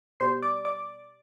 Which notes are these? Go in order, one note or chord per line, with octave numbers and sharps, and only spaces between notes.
B2 G3 C5 C6
D5 D6
D5 D6